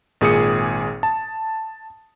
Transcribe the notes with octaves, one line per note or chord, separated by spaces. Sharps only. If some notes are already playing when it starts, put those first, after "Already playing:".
G#1 A#2 G#4 G#5 D#6 C#7
A5